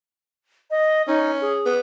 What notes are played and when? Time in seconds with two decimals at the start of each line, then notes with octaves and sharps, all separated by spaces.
0.71 D#5
1.08 C#4 D#4
1.41 G#4
1.66 B3